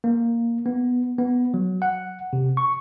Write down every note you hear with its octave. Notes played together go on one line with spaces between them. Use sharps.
A#3
B3
B3
F#3
F#5
C3
C#6